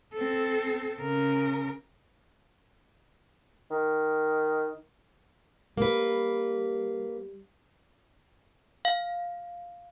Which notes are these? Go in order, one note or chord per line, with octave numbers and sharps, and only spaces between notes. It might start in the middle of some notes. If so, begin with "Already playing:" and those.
C4 A4
C#3 A#4
D#3
G3 A#3 B4
F5